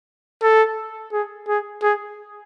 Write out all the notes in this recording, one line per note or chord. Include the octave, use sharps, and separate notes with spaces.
A4
G#4
G#4
G#4